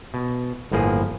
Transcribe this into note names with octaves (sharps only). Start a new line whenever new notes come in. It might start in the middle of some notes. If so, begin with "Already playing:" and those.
B2
G1 A2 F3 A#3 G#4